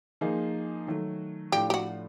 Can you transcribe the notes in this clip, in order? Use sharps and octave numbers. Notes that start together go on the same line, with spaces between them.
F3 A#3 D#4 G#4
D#3 F#3 A3
A2 F3 A3 D4 F4 G4
G4
F#4